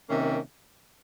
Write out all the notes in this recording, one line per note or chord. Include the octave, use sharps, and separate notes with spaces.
C3 D#3 A#3 C#4